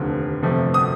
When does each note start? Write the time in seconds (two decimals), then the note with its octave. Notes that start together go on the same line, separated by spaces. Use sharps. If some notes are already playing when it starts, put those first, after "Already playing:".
Already playing: F1 D#2 D3 F3
0.43 G1 F2 C3 F3 A3
0.74 D#6